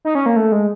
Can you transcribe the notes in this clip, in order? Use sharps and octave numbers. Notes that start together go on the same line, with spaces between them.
D#4
C#4
A#3
A3
G#3